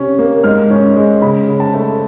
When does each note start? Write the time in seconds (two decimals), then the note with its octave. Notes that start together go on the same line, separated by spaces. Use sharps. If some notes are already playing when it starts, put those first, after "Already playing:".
Already playing: C3 C#4
0.19 A#3
0.43 G#2 F6
0.70 C#4
0.96 G#3
1.22 C#3 B5
1.48 C#3
1.60 A5
1.74 A3